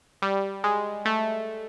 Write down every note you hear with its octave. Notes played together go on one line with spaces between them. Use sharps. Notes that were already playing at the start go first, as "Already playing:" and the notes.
G3
G#3
A3